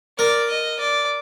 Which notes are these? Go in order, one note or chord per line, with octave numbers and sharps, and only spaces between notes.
A#4 D5
D#5
D5